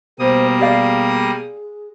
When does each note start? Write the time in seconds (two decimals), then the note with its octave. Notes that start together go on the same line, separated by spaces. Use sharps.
0.19 B2 G3 A#3 C5 D#6
0.59 G4 G#4 D5 F5